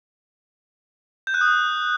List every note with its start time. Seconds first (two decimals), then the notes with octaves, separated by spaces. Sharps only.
1.27 G6
1.34 F#6
1.41 D#6